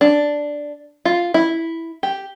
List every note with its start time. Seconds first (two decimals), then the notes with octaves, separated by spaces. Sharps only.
0.01 D4
1.05 F4
1.34 E4
2.03 G4